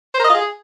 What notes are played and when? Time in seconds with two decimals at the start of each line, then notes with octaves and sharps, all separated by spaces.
0.14 C5
0.19 A#4
0.24 D#5
0.29 F4
0.34 G#4